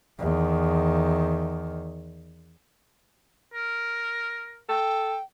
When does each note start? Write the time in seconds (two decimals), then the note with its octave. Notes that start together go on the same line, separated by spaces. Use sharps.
0.19 E2 D#3
3.54 A#4
4.69 A4 G5